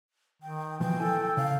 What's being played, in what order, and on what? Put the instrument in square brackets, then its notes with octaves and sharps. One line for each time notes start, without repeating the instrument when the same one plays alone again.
[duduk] D#3 [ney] G5
[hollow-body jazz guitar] B2 F3 [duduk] E3 [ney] G5
[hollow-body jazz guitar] E4 G#5 [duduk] A4
[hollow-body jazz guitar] C#3 [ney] F5